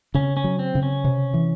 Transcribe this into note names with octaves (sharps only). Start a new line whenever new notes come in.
C#3 C#4
C#4
F#3
C4
C#3
C#4
C3
E3